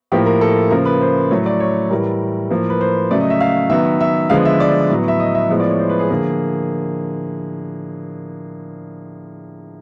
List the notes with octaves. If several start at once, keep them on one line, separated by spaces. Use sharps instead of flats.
A2 F3 A#3 G4
A#4
A4
C#3 F3 A#3 A#4
B4
C5
A2 F#3 A3 C#5
D5
C#5
A2 E3 G3 A#4
A2 F3 A#3
B4
C5
C#3 F#3 A3 D5
D#5
E5
F5
D#3 F#3 B3 E5
E5
D3 F3 G#3 B3 F5
E5
D5
A2 F#3 B3
E5
D#5
E5
A2 F3 G#3 B3
D5
C#5
C5
B4
G#4
D3 F3 A#3